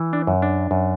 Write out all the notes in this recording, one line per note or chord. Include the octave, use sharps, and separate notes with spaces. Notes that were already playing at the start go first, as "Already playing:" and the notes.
Already playing: E3
D4
F#2
D4
F#2